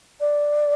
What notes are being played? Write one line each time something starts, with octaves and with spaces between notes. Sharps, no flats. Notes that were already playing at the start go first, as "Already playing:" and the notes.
D5